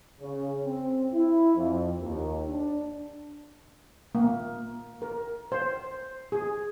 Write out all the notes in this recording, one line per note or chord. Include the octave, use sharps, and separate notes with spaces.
C#3
C4
E4
F2
D#2
D4
A#3
A#4
C5
G#4